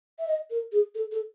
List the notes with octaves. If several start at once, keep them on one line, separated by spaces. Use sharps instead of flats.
E5
D#5
A#4
G#4
A4
A4